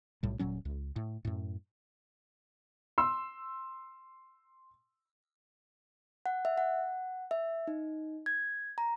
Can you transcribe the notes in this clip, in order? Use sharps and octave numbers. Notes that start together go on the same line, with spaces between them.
B1 A2 G3
D#1 A#2 F#3 C#4
C#2
A2
F#2 A2
C6 E6
F#5
E5
F#5
E5
D#4
G#6
A#5